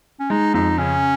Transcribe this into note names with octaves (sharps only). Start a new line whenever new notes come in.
C#4
G#3 D#4
F2 D#4
C#3 C#4